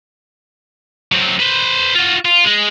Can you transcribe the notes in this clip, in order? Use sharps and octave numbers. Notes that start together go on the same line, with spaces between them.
F#3 C4
B4 C5
F4 F#4
F4
G#3